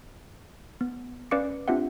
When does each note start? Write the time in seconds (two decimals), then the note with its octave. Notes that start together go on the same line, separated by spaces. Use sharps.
0.81 B3
1.31 C#4 B4 D5 F5 D6 C#7
1.68 C4 D4 F4 G4 E5 F#5